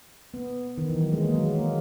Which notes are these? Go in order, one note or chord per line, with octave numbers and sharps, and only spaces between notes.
B3
D#3
E3
F#3
G#3
A#3
F#3
G#3
A#3